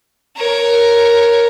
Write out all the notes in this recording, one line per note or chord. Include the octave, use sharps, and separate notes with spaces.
A#4 C#5